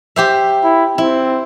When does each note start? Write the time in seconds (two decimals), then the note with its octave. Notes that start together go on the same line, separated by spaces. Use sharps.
0.16 G4 C5 E5
0.64 E4
0.98 C4 E4